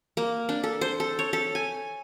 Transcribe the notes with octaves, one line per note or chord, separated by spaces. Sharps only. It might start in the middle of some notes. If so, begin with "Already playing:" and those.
A#3
D4
A4
C5
A4
C#5
A4
G#5